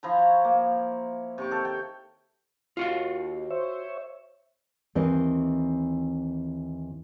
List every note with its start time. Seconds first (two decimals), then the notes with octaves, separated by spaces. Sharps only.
0.03 F3 E4 A#5
0.19 C#5
0.45 A#3
1.38 C3 C#6 D6
1.51 D#3 A4 C#5
1.65 G5
2.77 D#2 F4 F#4 F5
3.50 C5 C#5 E5
4.95 D#2 E3 C4 D#5